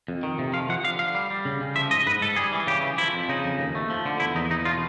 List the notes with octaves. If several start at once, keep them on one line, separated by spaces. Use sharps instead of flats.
F2
D#3
C3
F3 F5
F3 F#5
D3 F5
D3 F5
G3
G3
C#3
C#3
F3 E5
G#2 D#5
G#2 B4
G#2 A4
G3 G#4
E3
C#3 G4
E3
F3 E4
F2
C#3 D#4
F2
D#2
A3
F3
D3
E2 E4
E2 D#4
E2 D#4
B2 F4